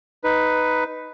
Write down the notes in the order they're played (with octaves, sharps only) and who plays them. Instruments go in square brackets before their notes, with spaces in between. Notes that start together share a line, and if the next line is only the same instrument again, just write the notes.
[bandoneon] D#4 B4